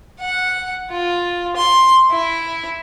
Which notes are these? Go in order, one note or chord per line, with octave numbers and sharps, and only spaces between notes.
F#5
F4
C6
E4